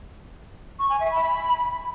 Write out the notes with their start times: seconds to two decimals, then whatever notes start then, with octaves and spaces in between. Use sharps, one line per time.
0.79 C#6
0.90 G#5
1.00 E5
1.11 B5